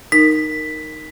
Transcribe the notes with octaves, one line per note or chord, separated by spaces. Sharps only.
D#4 A#4 B6